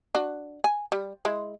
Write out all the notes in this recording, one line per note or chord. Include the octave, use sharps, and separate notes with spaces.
D4 F#4
G#5
G3
G#3 E4